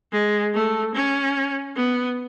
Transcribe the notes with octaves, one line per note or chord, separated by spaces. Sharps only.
G#3
A3
C#4
B3